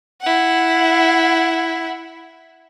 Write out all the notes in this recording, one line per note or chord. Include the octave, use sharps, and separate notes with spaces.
E4 F#5